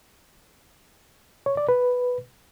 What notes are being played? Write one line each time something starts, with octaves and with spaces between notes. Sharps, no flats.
C#5
D5
B4